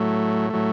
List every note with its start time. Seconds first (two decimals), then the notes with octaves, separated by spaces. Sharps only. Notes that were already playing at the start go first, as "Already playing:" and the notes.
Already playing: A2 F#3 A3
0.50 A2 F#3 A3